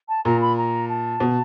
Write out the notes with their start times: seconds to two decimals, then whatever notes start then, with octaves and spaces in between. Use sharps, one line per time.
0.08 A5
0.25 A#2 A#5
0.41 B5
0.57 A#5
0.89 A5
1.20 B2